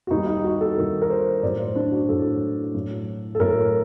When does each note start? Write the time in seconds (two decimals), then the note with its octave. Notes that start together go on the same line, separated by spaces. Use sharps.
0.07 F#4
0.11 D#2 D#3 G3 D#4
0.27 D#4
0.44 F#4
0.61 A4
0.77 D#2 D#3 G3 A#4
1.02 A#4
1.10 C5
1.43 A2 F#3 D5
1.59 C5
1.75 D4
1.92 F#4
2.09 A2 F#3 A4
2.74 A2 F#3
3.35 A4
3.40 A2 F#3 A#4